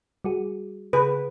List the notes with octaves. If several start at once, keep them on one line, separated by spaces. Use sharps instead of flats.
G3 F#4 G#4
C#3 G#4 B4 B5